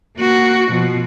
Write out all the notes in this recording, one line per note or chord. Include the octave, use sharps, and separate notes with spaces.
A#3 F#4
B2 F3